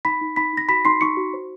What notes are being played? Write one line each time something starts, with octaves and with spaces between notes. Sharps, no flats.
D#4 B5 B6
D#4
D#4 B5 B6
D#4 A#6
F#4 B5 B6
D#4 C6 C7
D#4 C#6 C#7
F#4
C5